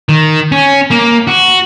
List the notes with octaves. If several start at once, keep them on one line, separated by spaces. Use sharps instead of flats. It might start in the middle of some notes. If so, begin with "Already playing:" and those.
D#3
C#4
A#3
F#4